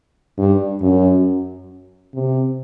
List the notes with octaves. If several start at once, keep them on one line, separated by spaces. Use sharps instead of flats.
G2
F#2
C3